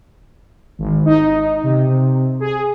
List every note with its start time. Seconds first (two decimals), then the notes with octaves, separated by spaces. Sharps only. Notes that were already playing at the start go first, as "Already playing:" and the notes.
0.79 G#1
1.06 D#4
1.64 C3
2.40 G#4